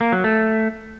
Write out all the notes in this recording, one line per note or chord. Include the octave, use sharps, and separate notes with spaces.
A#3
F#3
A3